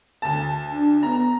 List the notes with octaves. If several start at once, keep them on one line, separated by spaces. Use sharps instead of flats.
D2 A5
D4
B3 A#5